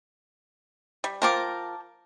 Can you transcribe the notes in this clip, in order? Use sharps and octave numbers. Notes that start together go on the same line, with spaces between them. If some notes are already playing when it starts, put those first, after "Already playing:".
G3
F3 F4 A#4 G5 A5 D6